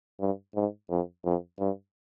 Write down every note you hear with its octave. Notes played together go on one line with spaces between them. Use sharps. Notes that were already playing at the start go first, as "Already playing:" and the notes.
G2
G#2
F2
F2
G2